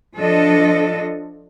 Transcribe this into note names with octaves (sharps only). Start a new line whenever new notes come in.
F3 D4 A4 D#5